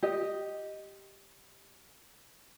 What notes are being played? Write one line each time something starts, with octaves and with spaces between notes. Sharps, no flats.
G4 D#5